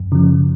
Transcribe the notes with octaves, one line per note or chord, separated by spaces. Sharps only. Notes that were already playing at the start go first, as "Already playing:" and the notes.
Already playing: F#2
C#3 F3